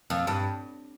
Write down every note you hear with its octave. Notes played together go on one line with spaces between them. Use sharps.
F2
G2